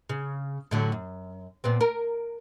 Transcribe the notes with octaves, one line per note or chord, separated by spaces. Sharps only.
C#3
A2 D3 F#3
F#2
A#2 B3 C4
A#4